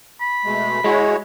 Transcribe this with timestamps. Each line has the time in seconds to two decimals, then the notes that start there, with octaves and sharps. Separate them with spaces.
0.21 B5
0.45 B2 G#3 A3
0.84 G#3 E4 F#4 C#5